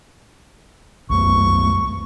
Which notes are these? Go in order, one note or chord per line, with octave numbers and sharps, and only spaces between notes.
C2 F#2 A3 C#6